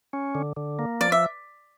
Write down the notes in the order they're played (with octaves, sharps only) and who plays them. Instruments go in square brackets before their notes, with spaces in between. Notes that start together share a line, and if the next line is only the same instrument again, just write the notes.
[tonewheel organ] C#4
D3
D3
A#3
[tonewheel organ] F3 [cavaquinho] D5
[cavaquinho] E5